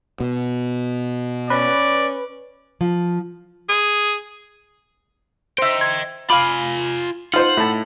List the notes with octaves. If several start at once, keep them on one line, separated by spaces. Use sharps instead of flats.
B2
C#4 B4 D5
F3
G#4
C5 D#5 E5 G5
C6 G#6
F4 F5 G#5 B5 D6
D#4 F4 C5 F#5 C6
A2 E5 A5